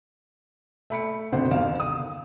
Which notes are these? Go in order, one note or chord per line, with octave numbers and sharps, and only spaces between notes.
A3 B5 C#7
G#1 B2 D3 C5 F#5
G1 D#2 F5 E7
D#6